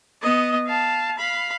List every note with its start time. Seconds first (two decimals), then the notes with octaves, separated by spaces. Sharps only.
0.22 B3 D#5
0.67 F5 A5
1.18 F5 B5